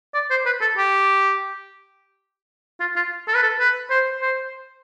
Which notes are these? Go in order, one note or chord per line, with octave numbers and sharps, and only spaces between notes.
D5
C5
B4
A4
G4
F4
F4
A4
B4
A4
B4
C5
C5